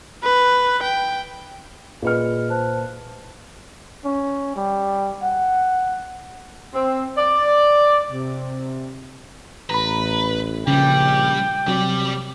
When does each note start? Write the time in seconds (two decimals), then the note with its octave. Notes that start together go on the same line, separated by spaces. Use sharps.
0.24 B4
0.83 G5
2.02 A#2 G#4 B4 D#5 F6 C#7
2.50 C5 A5 F#6
4.05 C#4
4.56 G3
5.22 F#5
6.74 C4
7.17 D5
8.11 C3
9.70 A1 B4 A#5 B5
10.67 A#1 C#3 G3 G5
11.68 C3 F#3 G3 D5